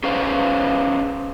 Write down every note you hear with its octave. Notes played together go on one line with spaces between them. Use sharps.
C#4 G#4 B4 C5 F5